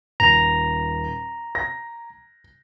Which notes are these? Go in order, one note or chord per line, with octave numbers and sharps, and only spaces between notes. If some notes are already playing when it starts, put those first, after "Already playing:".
D#1 A#5
A#6